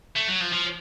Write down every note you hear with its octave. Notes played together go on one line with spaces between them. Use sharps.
A3
F#3
F3
F3